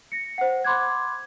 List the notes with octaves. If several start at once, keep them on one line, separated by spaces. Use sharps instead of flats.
A#6 C#7
C5 F#5
B5 C6 D6 F#6 G#6